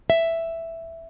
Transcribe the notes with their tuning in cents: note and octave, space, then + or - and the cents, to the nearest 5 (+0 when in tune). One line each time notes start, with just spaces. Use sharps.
E5 +5